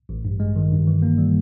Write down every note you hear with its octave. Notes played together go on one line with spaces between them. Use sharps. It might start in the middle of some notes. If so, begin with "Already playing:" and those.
A1
G2
G#3
D#3
G2
E3
A#3
G3